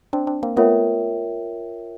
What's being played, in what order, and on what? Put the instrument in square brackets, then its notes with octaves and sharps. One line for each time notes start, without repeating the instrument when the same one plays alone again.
[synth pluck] C4 D4
C4 D4
A#3 C4
[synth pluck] A3 B3 [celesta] F4 A#4 C#5 E5 G5